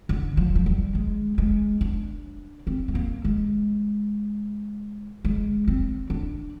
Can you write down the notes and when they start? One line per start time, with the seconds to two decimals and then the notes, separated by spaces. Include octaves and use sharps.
0.09 D3
0.37 F3
0.55 F3
0.66 G3
0.95 G#3
1.38 G#3
1.81 D4
2.67 C4
2.88 G#3
2.95 A#3
3.24 G#3
5.25 G#3
5.68 C4
6.10 D4